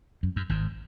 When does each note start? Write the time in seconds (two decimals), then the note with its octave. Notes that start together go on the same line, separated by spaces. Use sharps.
0.23 F#2
0.36 F#2
0.49 G#1 G#2